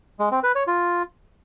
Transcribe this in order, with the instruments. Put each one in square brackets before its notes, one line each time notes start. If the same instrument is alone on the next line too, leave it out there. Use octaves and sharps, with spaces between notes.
[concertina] G#3
C4
B4
C#5
F4